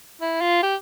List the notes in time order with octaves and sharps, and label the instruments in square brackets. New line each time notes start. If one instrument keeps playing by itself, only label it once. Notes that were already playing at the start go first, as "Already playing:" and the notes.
[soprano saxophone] E4
F4
G4